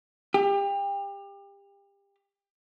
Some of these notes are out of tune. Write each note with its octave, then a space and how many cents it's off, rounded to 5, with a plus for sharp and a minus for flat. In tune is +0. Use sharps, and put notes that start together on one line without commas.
G4 +30